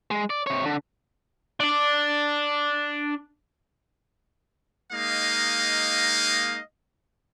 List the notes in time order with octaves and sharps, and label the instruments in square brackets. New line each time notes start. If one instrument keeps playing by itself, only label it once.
[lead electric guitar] G#3
D5
C3 C#5
D3
[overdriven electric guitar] D4 D5
[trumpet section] G#3 A#3 D#4 D#5 F5